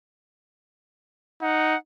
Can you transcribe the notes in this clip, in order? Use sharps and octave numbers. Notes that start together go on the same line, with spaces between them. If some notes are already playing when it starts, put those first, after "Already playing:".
D#4 F#5